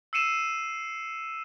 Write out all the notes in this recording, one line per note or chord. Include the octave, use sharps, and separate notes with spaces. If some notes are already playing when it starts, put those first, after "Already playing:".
E6 C7 C#7 D#7 E7